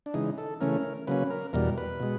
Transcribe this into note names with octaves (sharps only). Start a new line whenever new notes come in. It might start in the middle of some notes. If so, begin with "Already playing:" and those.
D4
C#3 E3 G#3 D#4
A4
C#3 E3 A3 C#4 A#4
C#3 F#3 A#3 C#4 B4
A#4
E2 B2 G3 A#4
B4
B2 G#3